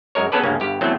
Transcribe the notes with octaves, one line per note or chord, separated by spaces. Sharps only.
F#2 G#3 A#4 C#5
B3 C#4 G#4 A4 B4 D5
D2 G2 C#3 A#3 C#4
G1 G2 G4
E2 F#3 A3 C4 E4